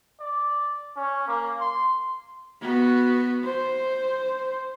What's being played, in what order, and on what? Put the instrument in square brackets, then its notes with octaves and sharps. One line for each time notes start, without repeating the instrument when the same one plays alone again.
[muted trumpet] D5
C#4
A#3
C6
[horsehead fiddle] B3 F#4
C5